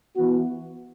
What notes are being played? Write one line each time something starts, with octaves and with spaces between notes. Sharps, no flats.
E3 B3 F#4